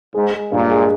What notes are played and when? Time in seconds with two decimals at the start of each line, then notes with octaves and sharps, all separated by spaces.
0.14 G#2 G#3
0.34 G#3
0.52 G2 A#2
0.71 G#3